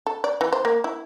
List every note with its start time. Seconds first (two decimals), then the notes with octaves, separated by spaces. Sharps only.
0.07 A4
0.24 D5
0.41 E3
0.53 C5
0.65 A#3
0.84 E4